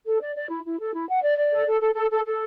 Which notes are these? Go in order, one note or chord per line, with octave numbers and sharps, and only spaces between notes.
A4
D5
D5
E4
E4
A4
E4
F#5
D5
D5
A4
A4
A4
A4
A4
A4